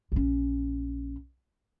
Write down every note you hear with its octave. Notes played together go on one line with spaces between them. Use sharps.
A#1 C#4